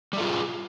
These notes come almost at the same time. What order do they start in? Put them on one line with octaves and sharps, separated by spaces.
G3 A3 F4 G#4